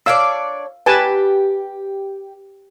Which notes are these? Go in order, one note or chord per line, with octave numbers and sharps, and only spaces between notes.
D4 C#5 D5 F5 E6
G4 B4 G#5 A5